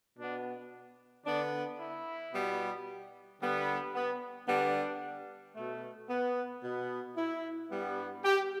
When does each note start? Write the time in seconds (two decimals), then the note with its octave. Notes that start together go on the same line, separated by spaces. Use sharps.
0.18 B2 B3 D4
1.25 D3 B3 D4
1.80 E4
2.33 B2 G3 B3
3.41 D3 G3 B3
3.95 B3
4.48 D3 G3 B3 D4
5.55 B2 A3
6.09 B3
6.62 B2 B3
7.17 E4
7.71 G2 G3 B3
8.25 G4